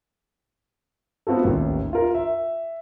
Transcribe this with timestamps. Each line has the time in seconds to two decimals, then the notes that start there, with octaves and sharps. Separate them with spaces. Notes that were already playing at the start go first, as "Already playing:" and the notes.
1.27 B3 C4 F4 F#4 A4
1.44 A1 D#2
1.93 F4 A#4
2.15 E5